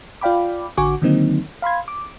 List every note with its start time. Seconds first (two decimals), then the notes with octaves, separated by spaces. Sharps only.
0.21 F4 D5 F5 G5 B5 D6
0.77 A1 D3 F#4 G#5 C#6 D6
1.02 D3 D#3 F#3 A#3 C4 D#4
1.62 F5 B5 C6 G#6
1.88 D6